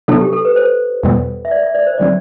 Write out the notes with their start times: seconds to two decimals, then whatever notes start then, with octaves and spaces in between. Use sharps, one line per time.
0.08 C3 F#3 B3 D4 A4
0.21 G4
0.33 A4
0.45 B4
0.56 C5
1.03 E2 B2 G3 B3
1.45 E5
1.51 D5
1.63 E5
1.75 D5
1.87 C5
1.98 D3 F#3 C4 D5